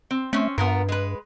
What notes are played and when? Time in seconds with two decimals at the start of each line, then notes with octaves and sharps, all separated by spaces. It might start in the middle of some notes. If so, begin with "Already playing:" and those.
0.11 C4
0.33 A3 C4 C#4
0.58 G2 B3 F4 A#4
0.88 G#3 B4